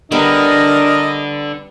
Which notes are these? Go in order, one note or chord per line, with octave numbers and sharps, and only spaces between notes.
D3 G3 B3 D4 A#4 D#5